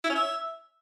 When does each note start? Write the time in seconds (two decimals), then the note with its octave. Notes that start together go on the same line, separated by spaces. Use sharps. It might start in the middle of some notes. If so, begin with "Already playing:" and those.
0.04 E4
0.10 C#4
0.15 E5